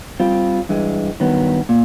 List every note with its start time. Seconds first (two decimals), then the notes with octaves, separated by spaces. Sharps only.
0.20 G3 C4 F4
0.69 G2 E3 G#3
1.20 G2 D#3 F#3 B3
1.69 A#2